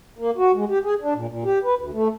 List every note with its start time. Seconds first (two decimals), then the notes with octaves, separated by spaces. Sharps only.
0.19 A#3
0.37 F#4
0.55 G#3
0.69 G4
0.84 G#4
1.01 D4
1.15 A#2
1.28 A#2
1.45 G4
1.64 B4
1.79 D2
1.93 A3